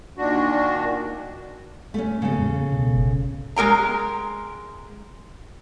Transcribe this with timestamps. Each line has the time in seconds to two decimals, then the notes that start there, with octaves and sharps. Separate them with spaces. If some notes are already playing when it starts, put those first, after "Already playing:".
0.17 A#2 D#3 D4 F#4
1.94 A3 C#4
2.22 C#3 G#3 A#3 B3 A4
2.38 E2 A2 G#3
2.70 C#2 B2 C#4
2.95 G1
3.56 G#3 A#4 G5 A#5